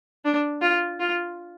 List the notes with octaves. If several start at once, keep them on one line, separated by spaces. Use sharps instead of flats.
D4
F4
F4